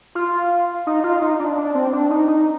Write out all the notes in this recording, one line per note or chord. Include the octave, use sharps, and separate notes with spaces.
F4
D#4
F4
D#4
D4
D4
C4
D4
D#4
D#4